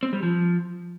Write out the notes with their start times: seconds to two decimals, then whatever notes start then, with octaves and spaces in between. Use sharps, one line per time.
0.03 C4
0.13 G3
0.23 F3